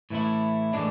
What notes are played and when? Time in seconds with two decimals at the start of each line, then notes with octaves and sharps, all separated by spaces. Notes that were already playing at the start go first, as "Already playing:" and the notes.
0.10 A2 E3 A3 E4
0.73 A2 E3 G#3 D4